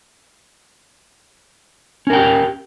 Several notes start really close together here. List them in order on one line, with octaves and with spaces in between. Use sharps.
C#4 A#4 G5 G4